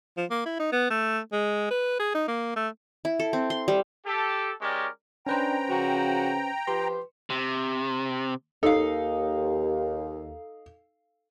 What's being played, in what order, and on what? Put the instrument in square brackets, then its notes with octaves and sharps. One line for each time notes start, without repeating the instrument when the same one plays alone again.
[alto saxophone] F3
A#3
E4
D#4
B3
A3
G#3
B4
G#4
D#4
A#3
A3
[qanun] E4
A4
C4
C6
G3
[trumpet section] G4 A4
G#3 C#4 G4 A#4 C#5 D5
[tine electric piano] C#4 B4 C5 [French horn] D4 [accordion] G5 A#5
[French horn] C#3 [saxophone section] F3 F#4
[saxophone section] F3 G4 [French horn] B4 [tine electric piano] C6
[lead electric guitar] C3
[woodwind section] D#2 [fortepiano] D#4 [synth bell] A4 F5